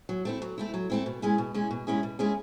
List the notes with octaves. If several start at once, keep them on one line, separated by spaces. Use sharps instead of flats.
F#3
A3 C4 E4
F#3
A3 C4 E4
F#3
A3 C4 E4
B2
G#3 C#4 E4 G#4
B2
G#3 C#4 E4 G#4
B2
G#3 C#4 E4 G#4
B2
G#3 C#4 E4 G#4